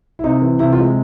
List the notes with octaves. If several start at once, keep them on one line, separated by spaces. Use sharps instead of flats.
E4
C3 D#4
E3
C3 E4
F4
G#3